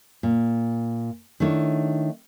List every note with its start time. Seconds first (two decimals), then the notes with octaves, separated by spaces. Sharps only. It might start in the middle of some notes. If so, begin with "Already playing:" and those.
0.23 A#2
1.40 D#3 A3 D4 E4 C#5